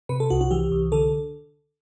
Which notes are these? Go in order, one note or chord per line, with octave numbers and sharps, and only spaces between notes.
C3 B4
A4
C2 F#4
F#4
E3 G4
C2
D3 A4